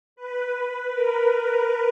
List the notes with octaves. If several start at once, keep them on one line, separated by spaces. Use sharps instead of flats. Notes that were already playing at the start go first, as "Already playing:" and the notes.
B4
B4
A#4